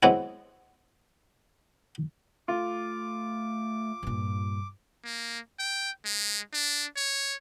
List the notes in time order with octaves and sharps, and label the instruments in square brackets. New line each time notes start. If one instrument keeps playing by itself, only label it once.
[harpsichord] F#3 G#3 B3 C4 E4
[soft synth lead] A3 [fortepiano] F4 [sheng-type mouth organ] D6
[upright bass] G2 A#2
[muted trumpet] A#3
G5
G#3
D4
C#5